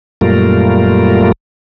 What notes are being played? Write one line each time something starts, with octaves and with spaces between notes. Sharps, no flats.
F#2 A#2 G3 A3 F4 A#4